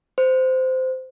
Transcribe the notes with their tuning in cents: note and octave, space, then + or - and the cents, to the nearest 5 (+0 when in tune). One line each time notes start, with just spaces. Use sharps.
C5 -15